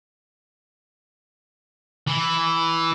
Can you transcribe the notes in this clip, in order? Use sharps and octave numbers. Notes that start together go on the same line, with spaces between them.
E3 E4